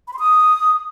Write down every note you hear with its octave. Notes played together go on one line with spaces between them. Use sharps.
B5
C6
D#6